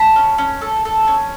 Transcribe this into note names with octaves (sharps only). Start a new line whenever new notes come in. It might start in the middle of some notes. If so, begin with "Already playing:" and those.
Already playing: A5 B5
C#4
C#4
A4
A4
C#4